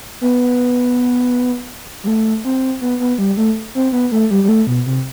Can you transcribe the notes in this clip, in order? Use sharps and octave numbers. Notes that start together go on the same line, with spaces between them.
B3
G3
A3
C4
B3
B3
G3
A3
C4
B3
A3
G3
G3
A3
B2
C3